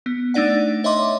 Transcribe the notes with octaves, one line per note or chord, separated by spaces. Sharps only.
B3
A3 D4 D#4 D5 F#5
C#5 D#5 E5 C6 D6